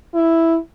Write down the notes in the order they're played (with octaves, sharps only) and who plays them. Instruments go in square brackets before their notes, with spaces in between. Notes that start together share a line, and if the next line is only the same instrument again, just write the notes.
[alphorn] E4